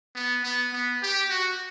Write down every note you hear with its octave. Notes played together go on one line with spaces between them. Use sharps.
B3
B3
B3
G4
F#4